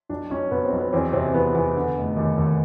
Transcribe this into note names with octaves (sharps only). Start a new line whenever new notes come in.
B1 D4
B1 C#4
B2 B3
C4
B1
B3
E2 C4
C3 C4
C4
E2 B3
E2 B3
D3
F1
D#2
D#2